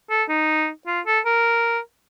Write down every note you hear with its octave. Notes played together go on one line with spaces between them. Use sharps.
A4
D#4
F4
A4
A#4